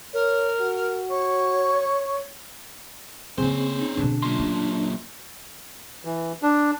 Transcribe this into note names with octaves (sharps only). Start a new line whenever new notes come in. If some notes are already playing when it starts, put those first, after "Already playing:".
A#4 C#5
F#4
C#5 C#6
C#3 A#3 C4 C#4 G#4 C5
D#4
B2 D3 D4
F#2 A#2 C6
A3
E3
D4